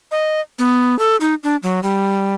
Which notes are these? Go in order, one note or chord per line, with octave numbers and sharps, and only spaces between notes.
D#5
B3
A4
D#4
D4
F#3
G3